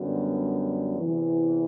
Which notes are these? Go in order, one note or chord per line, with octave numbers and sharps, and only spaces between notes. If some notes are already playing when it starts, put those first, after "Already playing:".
Already playing: F#2 D3 G3 B3 F#4
E2 C3 E3